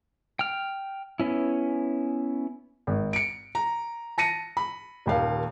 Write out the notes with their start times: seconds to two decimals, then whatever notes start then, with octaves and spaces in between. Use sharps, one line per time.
0.39 G5 F6
1.20 B3 C#4 E4
2.87 G#1
3.13 C#7 D7
3.55 A#5
4.18 A5 A#6 C#7 D#7
4.57 B5
5.06 D#1 D#2 F5